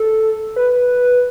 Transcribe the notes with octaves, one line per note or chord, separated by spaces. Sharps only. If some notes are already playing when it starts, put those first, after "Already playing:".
Already playing: A4
B4